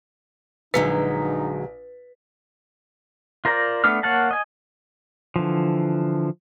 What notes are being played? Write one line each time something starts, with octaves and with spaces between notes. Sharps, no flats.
A#1 D3 F#3 G#3 D#4 B4 B6
F4 A#4 C5 D5 A#5
A3 B3 D4 D6 F6
A#3 C#5 F5 F#5 A5
D#5 G#5
D3 E3 F3